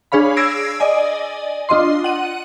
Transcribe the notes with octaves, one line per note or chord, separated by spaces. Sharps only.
D4 G#4 C#5 F5 B5
E6 G#6 A#6 C7 D7
D5 D#5 G#5
D4 F4 D#5 C6
F#5 D#7